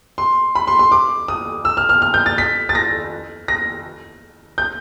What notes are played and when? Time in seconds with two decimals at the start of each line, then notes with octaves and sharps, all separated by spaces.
0.18 C6
0.55 B5
0.67 C6
0.79 C6
0.92 D6
1.28 D#6
1.65 E6
1.77 F6
1.89 F6
2.02 F6
2.14 G6
2.26 A6
2.38 B6
2.69 A6
2.75 A#6
3.48 A#6
4.58 G6